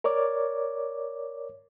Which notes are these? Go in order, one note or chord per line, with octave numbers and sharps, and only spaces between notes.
A#4 C#5 D5 D6